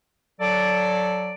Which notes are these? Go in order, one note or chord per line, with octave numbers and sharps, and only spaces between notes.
F#3 A4 D5